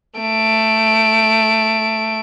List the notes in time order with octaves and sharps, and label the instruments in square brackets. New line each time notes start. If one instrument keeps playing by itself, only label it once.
[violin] A3 D7